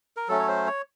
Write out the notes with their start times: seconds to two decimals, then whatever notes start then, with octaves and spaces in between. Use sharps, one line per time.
0.17 A#4
0.28 F#3 A3 C#4 A4
0.39 C#5
0.48 C5
0.66 C#5